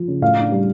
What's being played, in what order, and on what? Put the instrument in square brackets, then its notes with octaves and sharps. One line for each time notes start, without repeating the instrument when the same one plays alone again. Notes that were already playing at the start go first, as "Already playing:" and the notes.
Already playing: [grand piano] F3
C#3
A2 F5
D4
G3